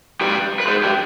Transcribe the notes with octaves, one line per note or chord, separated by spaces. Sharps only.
G4 B4
B4
G#4 C5
G4 B4